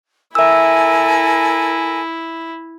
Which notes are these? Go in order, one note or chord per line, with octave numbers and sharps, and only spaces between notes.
E4 A4 A#4 E5 G#5 E6